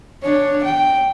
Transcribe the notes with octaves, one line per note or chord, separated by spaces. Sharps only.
D4 C#5
G5